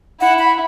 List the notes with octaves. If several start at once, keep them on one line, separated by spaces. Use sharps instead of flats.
E4 F#5
B5